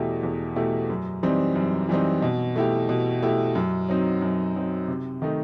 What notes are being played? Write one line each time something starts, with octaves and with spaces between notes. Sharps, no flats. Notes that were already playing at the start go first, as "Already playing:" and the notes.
Already playing: E2 B2 A3 E4 G4
E2
B2 A3 E4 G4
F#2
E3 G3 C4 D#4
F#2
E3 G3 C4 D#4
B2
A3 E4 G4
B2
A3 E4 G4
F#2
F#3 C4 D#4
F#2
F#3 C4 D#4
C3
D#3 A3 D#4